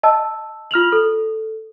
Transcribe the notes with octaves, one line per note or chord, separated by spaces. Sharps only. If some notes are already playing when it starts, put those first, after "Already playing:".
D#5 A5 E6
F4 F6 F7 F#7
A4